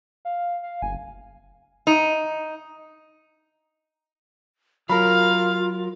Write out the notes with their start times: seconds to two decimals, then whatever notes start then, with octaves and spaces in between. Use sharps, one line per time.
0.25 F5
0.63 F5
0.82 F#1 G#5
1.87 D#4
4.89 F#3 F4 A#4 F5 B5